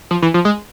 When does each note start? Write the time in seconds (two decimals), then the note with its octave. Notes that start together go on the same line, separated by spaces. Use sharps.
0.11 F3
0.22 E3
0.34 F3
0.45 G#3